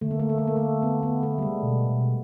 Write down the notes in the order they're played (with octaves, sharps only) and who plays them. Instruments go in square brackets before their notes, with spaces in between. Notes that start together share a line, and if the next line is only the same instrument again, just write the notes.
[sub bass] D3 [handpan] A3
[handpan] A#3
A3
A#3
A3
A#3
A3
B3
B3
A3
G3
G#3
[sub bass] B2
B2